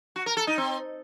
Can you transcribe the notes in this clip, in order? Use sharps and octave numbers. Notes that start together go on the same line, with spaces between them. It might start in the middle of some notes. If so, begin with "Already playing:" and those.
F#4
A#4
A4
D#4
C4